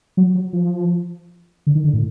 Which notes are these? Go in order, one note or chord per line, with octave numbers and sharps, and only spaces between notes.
F#3
F#3
F3
D3
D#3
D3
A2